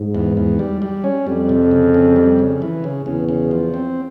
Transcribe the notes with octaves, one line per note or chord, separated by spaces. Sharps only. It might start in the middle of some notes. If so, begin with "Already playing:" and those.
Already playing: G#2
E2
E2
G3
G3
C#4
F2 G3
C3
C#3
C#3
G3
C#3
E3
C#3
E2 C#3
C#3
F3
C4